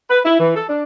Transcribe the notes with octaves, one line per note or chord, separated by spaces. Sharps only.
B4
E4
E3
A4
D4